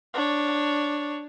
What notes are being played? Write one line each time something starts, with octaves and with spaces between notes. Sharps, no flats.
D4 C#5